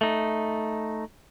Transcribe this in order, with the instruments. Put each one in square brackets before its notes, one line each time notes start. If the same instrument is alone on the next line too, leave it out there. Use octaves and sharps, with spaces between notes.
[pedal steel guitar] A3 D#4